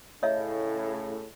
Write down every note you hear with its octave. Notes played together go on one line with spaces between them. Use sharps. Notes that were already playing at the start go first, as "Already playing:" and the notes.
A2 C#3 C#5 D#5 E5